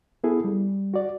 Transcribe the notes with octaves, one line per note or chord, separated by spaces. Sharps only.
B3 E4 G#4 A4
G3
F#4 D5